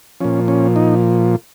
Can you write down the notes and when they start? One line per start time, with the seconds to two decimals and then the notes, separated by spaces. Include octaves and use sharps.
0.20 A#2 F3 C#4
0.48 C#4
0.76 D#4